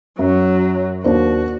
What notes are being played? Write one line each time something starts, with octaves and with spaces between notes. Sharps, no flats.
F#2 F#3
D#2 D4 F#4 C5